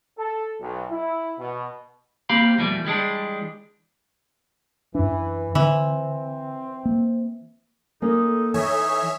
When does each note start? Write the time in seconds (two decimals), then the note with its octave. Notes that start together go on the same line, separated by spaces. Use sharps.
0.18 A4
0.61 B1
0.91 E4
1.39 B2
2.29 A#3 C4 G4 F5 B5
2.58 F2 B2 E3 G3 A3
2.85 E3 G3 G#3 D4
4.95 F#2 E3 D4
5.55 D3 E3 C4
6.86 A#3
8.02 A#3 C#4 D#4 A4
8.54 E3 D#4 C#5 E5 G#5